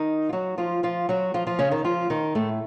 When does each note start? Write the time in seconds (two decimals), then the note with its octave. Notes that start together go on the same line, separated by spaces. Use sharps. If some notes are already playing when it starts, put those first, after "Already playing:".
Already playing: D#3 D#4
0.29 F4
0.33 F#3 F#4
0.58 F3 F4
0.83 F3 F4
1.09 F#3 F#4
1.34 F3 F4
1.47 F3 F4
1.59 C#3 C#4
1.71 D#3 D#4
1.84 F3 F4
2.10 D#3 D#4
2.35 A2 A3